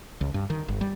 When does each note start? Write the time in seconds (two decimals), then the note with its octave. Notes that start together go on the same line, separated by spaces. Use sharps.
0.21 C#2
0.34 G2
0.50 D#3
0.68 G1
0.81 G3